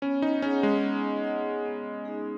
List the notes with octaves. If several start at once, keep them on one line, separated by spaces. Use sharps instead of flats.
B3 C#4
D#4
C#4 G#4 D#5 F#5
G#3
B3
G#4 D#5 F#5
B3
D#4 G#4